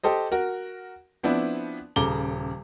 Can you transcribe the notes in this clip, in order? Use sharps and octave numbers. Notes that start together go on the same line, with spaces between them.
G4 A4 C5 D#5
F#4 A#4
F3 B3 C4 D4 E4
D#1 C#3 A4 A#5 D6 G7